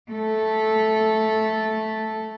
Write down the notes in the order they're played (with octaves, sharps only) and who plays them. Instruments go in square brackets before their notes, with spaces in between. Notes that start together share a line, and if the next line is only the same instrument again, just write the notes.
[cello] A3 A4